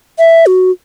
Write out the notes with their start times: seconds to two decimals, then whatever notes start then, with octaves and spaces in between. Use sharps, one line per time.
0.19 E5
0.46 F#4